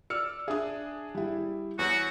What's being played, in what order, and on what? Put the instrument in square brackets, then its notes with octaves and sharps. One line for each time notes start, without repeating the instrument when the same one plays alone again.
[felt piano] D5 [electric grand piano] E6 F6 C#7
[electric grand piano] D4 G#4 [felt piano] E5 D#6
[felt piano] G3 E4
[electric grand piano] E2 [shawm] F#4 [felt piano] C#5